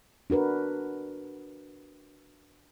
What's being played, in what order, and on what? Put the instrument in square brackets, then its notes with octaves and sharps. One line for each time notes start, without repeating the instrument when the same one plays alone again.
[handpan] D4 F#4 A#4 B4